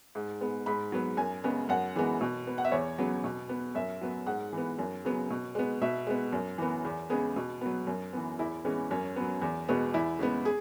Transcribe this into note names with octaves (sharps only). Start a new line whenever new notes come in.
G#2
G#3 B3
G#2 B5
F#3 B3
F#2 G#5
C#3 G#3 B3
F#2 F#5
E3 G#3 B3
B2
B3
F#5
E5
E2 C#5
C#3 F#3 B3
B2
B3
F#2 E5
F#3 B3
G#2 F#5
E3 B3
F#2
C#3 F#3 B3
B2
G#3 B3
B2 E5
G#3 B3
F#2
E3 B3
E2
C#3 G#3 B3 G#4
B2
F#3 B3
F#2
E3 B3
E2 E4
E3 G#3 B3 C#4
F#2 C#4
F#3 B3
E2
B2 G#3 B3
E2 E4
C#3 G#3 B3
G#4